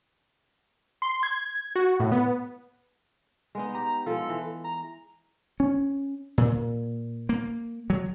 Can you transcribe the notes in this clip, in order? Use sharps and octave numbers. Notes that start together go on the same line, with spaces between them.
C6
G#6
F#4
A2
B3
G#3 B3 D#4
G4 A#5
F3 G#3 A4
E3
A#5
C#4
A#2
A#3
F#3